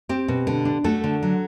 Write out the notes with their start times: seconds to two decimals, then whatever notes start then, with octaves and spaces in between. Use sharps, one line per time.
0.09 C4 G4
0.28 B2
0.47 D3
0.65 D4
0.84 A3 F#4 A4
1.04 D3
1.23 F#3